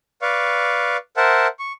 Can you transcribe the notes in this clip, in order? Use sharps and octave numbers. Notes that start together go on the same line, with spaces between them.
B4 D5 F5 C#6
A#4 C5 E5 F#5 A5
C#6